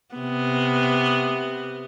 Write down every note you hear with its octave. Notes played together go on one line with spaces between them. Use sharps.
C3 B3